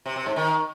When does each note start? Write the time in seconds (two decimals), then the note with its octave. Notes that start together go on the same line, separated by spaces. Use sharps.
0.06 C3
0.16 C3
0.26 G#2
0.36 D#3